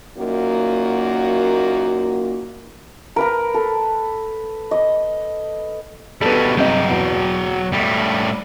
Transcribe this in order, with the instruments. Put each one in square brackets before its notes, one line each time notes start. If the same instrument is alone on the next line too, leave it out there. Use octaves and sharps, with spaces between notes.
[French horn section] F#2 A#2 A#3 D#4 F#4
[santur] A#4 B4 A#5
A4
D#5
[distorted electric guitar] B2 G3 [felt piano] A4 B4
[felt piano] G2 C3 D#5 [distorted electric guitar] F#3 G5
[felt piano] E2 B2 D7
[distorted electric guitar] A2 G3